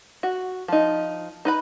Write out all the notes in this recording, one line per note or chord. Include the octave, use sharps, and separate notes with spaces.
F#4
F3 D#4
D#4 B4 B5